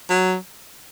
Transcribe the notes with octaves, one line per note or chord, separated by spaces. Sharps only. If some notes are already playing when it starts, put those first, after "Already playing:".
F#3